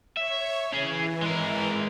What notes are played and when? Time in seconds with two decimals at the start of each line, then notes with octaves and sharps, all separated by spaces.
0.17 C#5 E5
0.73 E3 C#4 G#4
1.22 G#3 A#4